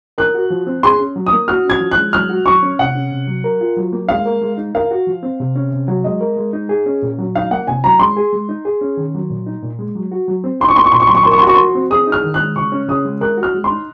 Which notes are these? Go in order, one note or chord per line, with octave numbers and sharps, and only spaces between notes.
A#4 F#6
F#4
F3
C4
G#4 C6
C#4
F#3
D#6
A#3
F#4 F6
C#4 G#6
F3
F#6
G#3
F#3 F6
F#4
F#3 C#6
C#4
C3 F#5
C#4
C3
F#3
A#4
F4
F#3
A#3
G#3 F5
A#4
G#3
D#4
A#4 F5
F#4
F3
C4
C3
C#4
C3
F#3
G#3 D#5
A#4
G#3
D#4
G#4
C#4
A#2
F#3
D#4 F5
A#3 F#5
C3 G#5
F#3 A#5
G#3 C6
G#4
G#3
D#4
G#4
C#4
D#3
F#3
A#2
D#4
A#2
G#3
F#3
F#4
F#3
C4
D#4 C6
C#6
A#3 C6
C#6
A#2 C6
C#6
F#3 C6
C#6
A#4 C6
C#6
C6
F#4 C#6
F3 C6
C4
G#4 D#6
D#4 F6
D#3
F#6
G#3
C#3 C#6
C#4
C#3 D#6
G#3
A#4 F#6
F#4
F6
G#3
C6
D#4